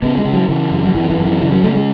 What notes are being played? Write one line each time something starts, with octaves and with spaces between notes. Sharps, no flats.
C#3 B3
G#3
C#3
F#3
C#3 E3
F#2
F#3
F#2 E3
E3
F#2
E3
C#3 E3
F#3
C#3 A3
G#3